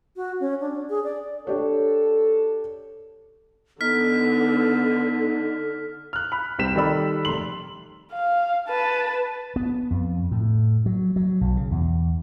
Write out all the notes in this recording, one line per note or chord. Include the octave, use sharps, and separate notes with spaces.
F#4
C#4
D4
G#4
D5
D4 G4 A4 C#5
D3 B3 D#4 F6 B6
F6 F#6
B5
C2 C4 B6 E7
D#3 G3 A4 D5 B5
F1 A3 C6 F#7
F5
B4 A5
B3
F2
A2
F#3
F#3
B1
C#3
E2